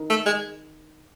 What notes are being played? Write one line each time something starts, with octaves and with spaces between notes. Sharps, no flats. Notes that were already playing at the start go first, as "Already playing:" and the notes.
Already playing: D#3
A3
G#3